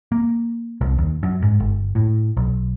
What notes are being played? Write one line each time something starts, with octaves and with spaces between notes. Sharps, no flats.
A#3
C2
D#2
F#2
G#2
G1
A2
B1